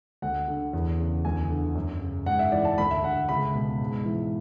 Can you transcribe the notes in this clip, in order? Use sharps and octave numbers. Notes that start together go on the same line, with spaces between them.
D2 F#5
D3
E2
C#3
D2 G#5
D3
F#2
C#3
G#2 F#5
E5
E3 D5
A5
D2 B5
E5
D3 F#5
C#2 B5
B2
G#2
E3